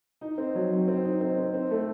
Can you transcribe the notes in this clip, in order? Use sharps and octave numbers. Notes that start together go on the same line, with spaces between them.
D#4
C4
F#3
C4
C4
D#4
C4
C4
C4
A3